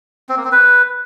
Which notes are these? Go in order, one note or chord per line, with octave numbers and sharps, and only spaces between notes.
C4
A#3
C4
B4